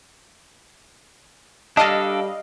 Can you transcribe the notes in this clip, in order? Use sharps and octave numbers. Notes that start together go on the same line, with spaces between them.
G3 D4 A4 D#5 F5 A5